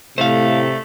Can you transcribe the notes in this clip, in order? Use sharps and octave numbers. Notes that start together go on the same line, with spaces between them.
A2 C3 A3 C5 F5